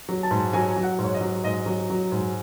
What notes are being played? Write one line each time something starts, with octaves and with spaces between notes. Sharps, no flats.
F#3
A5
G#2
F#3 G#5
F#3
F#5
G#2
C#5
D#5
F#3
G#2 D#5
F#3
F#3
G#2